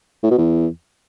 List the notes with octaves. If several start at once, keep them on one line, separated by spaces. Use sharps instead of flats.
A2
B2
E2